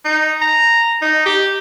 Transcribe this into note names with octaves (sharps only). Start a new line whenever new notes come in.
D#4
A#5
D#4
G4